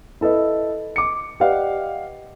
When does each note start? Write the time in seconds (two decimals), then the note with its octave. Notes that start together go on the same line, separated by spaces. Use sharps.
0.21 E4 A4 B4 D#5
0.96 D6 C#7
1.40 G4 B4 D5 D#5 F5 F#5